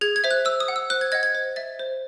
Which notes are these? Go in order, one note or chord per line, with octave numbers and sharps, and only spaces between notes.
G#4 G#6
G#6
C5 E5
F#6
C5 E6
D#6
F#5
E6
C5 F#6
G#6
D#5 F#5 G#6
G#6
C5
E5 A6
C5